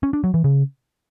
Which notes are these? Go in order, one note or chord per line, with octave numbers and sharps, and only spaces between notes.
C#4
D4
F#3
E3
C#3